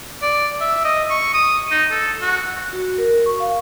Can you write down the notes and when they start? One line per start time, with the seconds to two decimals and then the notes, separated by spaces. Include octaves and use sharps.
0.22 D5
0.61 E5
0.85 D#5
1.10 C#6
1.34 D#6
1.71 D#4
1.91 A4
2.22 F#4
2.73 F#4
2.98 A#4
3.26 C#6
3.40 F5